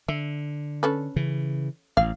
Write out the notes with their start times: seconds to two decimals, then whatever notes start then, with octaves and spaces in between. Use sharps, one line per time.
0.08 D3 E5
0.83 C#4 A4 B4
1.16 C#3 E3
1.97 A1 F5